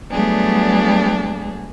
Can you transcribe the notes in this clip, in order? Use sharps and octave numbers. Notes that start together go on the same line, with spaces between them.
F#3 G3 A3 B3 D4 G#4